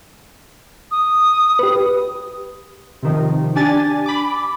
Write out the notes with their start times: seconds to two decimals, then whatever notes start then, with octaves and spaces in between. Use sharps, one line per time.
0.91 D#6
1.59 G4 B4
3.03 C3 D#3 F3
3.55 D4 G4 G#5 A6
4.06 B5 D6